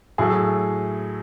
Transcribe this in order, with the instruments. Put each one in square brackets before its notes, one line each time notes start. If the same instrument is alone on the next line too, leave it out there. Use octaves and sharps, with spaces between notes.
[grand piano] A2 F#3 A3 G#4